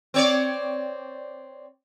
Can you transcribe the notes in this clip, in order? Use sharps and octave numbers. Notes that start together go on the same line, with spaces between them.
C4 C#5 D5